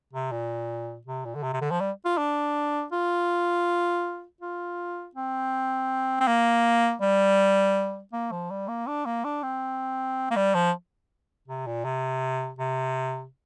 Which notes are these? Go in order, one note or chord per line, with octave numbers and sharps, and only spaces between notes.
C3
A#2
C3
A#2
D3
C3
C3
D3
F3
G3
F4
D4
F4
F4
C4
C4
A#3
G3
A#3
F3
G3
A#3
D4
A#3
D4
C4
A#3
G3
F3
C3
A#2
C3
C3